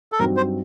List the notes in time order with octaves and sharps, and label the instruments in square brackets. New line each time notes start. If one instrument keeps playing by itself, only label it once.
[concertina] A4
[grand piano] G2 F#3 C4 D#4 F#4 [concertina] A#4
[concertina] C5